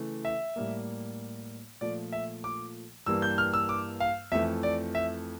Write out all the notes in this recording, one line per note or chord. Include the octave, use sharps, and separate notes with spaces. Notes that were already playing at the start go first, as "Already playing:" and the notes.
Already playing: C#3 E3 A3
E5
A2 G3 A#3
A#2 F3 A3 D5
E5
D6
G2 E3 G3 A#3 E6
G6
F6
E6
D6
F5
F2 E3 A3 E5
D5
E5